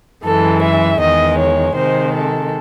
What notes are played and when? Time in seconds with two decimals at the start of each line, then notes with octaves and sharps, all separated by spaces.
0.25 F#2 E3 G#3 A4
0.63 E5
1.00 E2 D#3 G#3 D#5
1.38 C#5
1.75 C3 D#3 G#3 C5
2.13 A4